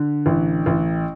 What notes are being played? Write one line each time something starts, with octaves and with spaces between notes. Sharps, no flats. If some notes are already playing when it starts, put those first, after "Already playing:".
Already playing: D3
A1
A1